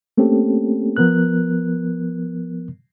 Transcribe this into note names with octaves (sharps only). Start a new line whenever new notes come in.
A3 A#3 C4 C#4 G4 A4
F3 B3 A#4 F#6